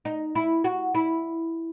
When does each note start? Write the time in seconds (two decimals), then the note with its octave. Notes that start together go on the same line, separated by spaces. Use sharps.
0.05 D#4
0.35 E4
0.64 F#4
0.95 E4